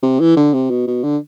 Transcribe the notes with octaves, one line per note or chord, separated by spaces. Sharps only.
C3
E3
D3
C3
B2
B2
D3